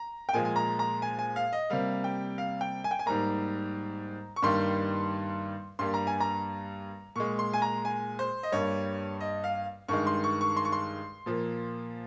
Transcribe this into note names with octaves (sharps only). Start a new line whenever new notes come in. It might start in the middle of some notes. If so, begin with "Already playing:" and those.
Already playing: A#5
G5
A#2 F3 G#3 G#5
G#5
A#5
A#5
G#5
G#5
F5
D#5
C3 G3 A#3 F5
G5
F5
G5
G#5
G5
G#5
G#2 G3 A#3 A#5
C#6
G2 D#3 G3 A#3 C6
G2 G3 A#3 C6
A#5
G#5
A#5
A#2 G#3 C#6
C6
G#5
A#5
G#5
C5
D#5
G2 G3 A#3 C#5
D#5
F5
G2 D#3 G#3 C#6
C6
C#6
C#6
C6
C#6
C6
A#2 F3 A#3